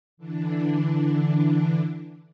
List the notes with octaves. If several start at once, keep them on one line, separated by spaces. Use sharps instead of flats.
D3 E3 D4